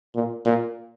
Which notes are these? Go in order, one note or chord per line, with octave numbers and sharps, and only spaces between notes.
A#2
A#2